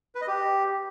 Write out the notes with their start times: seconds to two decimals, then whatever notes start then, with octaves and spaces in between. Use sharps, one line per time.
0.15 B4
0.21 D#5
0.28 G4